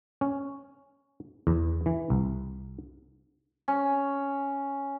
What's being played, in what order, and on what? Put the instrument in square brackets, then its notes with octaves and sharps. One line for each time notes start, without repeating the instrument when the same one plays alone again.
[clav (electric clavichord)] C#4
E2
E3
C2
[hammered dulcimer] C#4